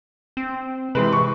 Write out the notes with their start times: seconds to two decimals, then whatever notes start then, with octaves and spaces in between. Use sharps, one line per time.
0.37 C4
0.95 C3 E3 G#3 B4
1.12 C#6